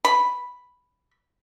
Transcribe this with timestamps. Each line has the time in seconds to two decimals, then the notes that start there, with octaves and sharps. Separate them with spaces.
0.05 B5